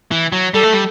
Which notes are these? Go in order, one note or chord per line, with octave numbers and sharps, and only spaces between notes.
E3
F#3
G3 A4
A3
G3